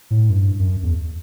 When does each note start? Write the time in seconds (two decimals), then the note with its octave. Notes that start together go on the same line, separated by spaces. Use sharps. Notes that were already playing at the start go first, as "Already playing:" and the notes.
0.11 A2
0.30 F#2
0.35 G2
0.59 F#2
0.83 E2